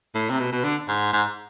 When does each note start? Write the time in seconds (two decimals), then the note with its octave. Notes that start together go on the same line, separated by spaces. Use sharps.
0.15 A2
0.30 C3
0.39 B2
0.52 B2
0.64 D3
0.88 G#2
1.13 G#2